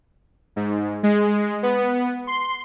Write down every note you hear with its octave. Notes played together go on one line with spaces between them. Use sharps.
G#2
G#3
B3
C6